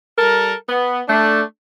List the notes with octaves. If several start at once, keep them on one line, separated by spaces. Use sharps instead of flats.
G3 A4 A#4
B3
A3 D4